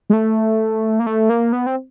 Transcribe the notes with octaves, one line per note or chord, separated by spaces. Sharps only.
G#3
A3
A#3
A3
A#3
B3
C4